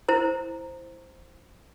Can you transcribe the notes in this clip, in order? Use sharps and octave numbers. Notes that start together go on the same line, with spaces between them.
E4 C5 A#5